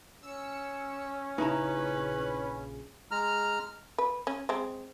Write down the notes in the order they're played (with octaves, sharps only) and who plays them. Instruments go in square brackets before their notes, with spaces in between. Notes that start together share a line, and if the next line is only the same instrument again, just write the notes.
[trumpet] C#4 [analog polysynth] E6 C#7
[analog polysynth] A#1 C#3 [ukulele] D#4 E4 A#5 [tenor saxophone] B4
[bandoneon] G#3 A#5 F6
[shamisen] B4
C#4
G#3 C4